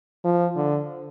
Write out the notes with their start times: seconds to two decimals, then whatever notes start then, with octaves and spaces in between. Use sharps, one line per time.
0.25 F3
0.56 D3